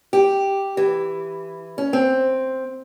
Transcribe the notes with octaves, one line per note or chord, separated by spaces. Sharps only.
G4
E3
C#4
C4